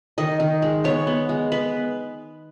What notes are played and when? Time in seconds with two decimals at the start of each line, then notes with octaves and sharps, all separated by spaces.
0.18 D#3 D#5
0.40 D#3
0.62 G#3
0.84 B3 C#5
1.07 B3
1.29 G#3
1.52 B3 B4